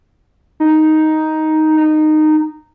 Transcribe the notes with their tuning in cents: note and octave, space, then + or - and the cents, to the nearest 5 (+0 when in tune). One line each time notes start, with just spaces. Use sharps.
D#4 +5
D#4 -15